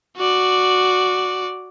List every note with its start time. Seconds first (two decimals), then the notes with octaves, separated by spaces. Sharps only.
0.17 F#4 D5